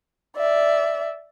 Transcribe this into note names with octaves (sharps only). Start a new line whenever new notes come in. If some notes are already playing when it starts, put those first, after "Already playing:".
D5 E5